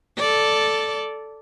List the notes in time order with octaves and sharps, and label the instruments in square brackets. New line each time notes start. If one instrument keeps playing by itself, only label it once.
[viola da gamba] A4 D5